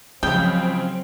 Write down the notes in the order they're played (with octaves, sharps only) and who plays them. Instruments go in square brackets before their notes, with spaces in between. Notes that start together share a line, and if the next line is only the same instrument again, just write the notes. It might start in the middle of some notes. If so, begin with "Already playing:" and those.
[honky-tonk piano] C#2 C#3 [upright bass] F3 [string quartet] F#3 C4 [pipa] G5